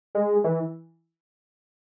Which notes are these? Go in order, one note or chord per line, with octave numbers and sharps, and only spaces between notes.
G#3
E3